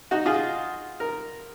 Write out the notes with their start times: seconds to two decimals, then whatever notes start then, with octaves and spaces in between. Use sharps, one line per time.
0.11 D#4 F#4
0.26 F4 G#4
1.00 A#4